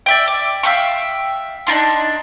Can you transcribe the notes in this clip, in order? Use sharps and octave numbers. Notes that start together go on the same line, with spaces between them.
D5 E5 G5
D6
E5 F5 G5 C#6
D4 D#4 F4 C6